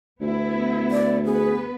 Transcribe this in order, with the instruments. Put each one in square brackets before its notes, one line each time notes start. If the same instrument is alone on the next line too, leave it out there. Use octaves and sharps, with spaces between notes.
[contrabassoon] D2 [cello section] B3 E4
[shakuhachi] D5
[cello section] B3 B4 [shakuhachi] G#4